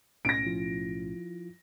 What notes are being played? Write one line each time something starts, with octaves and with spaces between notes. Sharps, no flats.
B1 A2 C#4 A#6 D7
F3 E4 F4